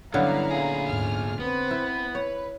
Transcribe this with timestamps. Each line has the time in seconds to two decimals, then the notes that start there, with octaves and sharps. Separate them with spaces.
0.14 G2 D3 F#3 B3 C#4 E4 F5 A#5
0.51 A#2 G#4
0.89 D#2 G#2 F6
1.40 F2 B3 C4 B4
1.71 E4
2.15 B4 C#5